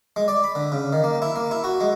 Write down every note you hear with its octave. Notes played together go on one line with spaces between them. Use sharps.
G#3
D5
B5
D3
C#3
D#3
A#3
E4
A#3
E4
F#4
G#3